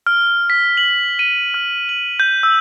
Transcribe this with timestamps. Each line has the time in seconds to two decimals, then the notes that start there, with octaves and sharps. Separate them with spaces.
0.07 F6
0.50 B6
0.77 F#7
1.19 D#7
1.54 F6
1.89 F#7
2.20 G6
2.43 E6